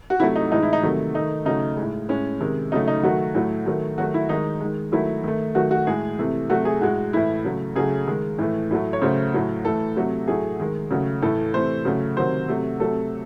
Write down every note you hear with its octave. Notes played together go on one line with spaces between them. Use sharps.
F#4
C3 F#3 A3 E4
D#4
A2 E3 G#3 D#4
E4
D#4
C3 D#3 F#3 A3
D#3 A3 D#4
C#3 F#3 A3 D#4
G#3
A2
A2 G#3 C#4
C3 D#3 G#3
C#3 F#3 A3 D#4
D#4
D#3 F#3 A3 F#4
A2 F#3 A3
D#3 F#3 A3
D#3 F#3 A3 F#4
E4
D#3 G#3 D#4
D#3 G#3
D#3 F#3 A3 E4
D#3 A3
D#3 F#3 A3 F#4
F#4
A2 G#3 G#4
C3 E3 A3
C3 F#3 A3 F#4
G#4
A2 G#3 F#4
A2 E3 A3 E4
C#3 F#3 A3
C#3 F#3 A3 G#4
D#3 G#3
A2 E3 A3
A2 F#3 A3
C#5
C#3 F#3 A3 C5
A2 F#3 A3
A2 E3 A3 A4
C3 F#3 A3
A2 F#3 A3 G#4
D#3 G#3
C#3 F#3 A3
A2 E3 A3 A4
C3 E3 A3 C5
C#3 F#3 A3
C3 D#3 F#3 C5
C3 F#3 A3
C3 F#3 A3 A4